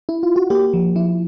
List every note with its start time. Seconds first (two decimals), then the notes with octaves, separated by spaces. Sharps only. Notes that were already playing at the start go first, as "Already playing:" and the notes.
0.09 E4
0.23 F4
0.36 F#4
0.50 A#3 G4
0.73 F3
0.96 F3 E4